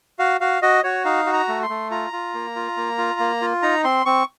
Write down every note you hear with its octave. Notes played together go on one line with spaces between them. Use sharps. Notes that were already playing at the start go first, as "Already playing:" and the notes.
F#4 F5
F#4 F5
F#4 D#5
F#4 C#5
D#4 F5
F#4
A#5
A3
C6
A3
F4 A#5
F4
A#3
F4
A#3
F4
A#3
F4
D#4 A#5
C4 C6
C4 C#6